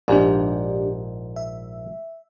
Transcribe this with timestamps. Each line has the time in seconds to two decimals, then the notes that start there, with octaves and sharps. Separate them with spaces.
0.08 A#1 G#2 D4 G4 D5
1.36 E5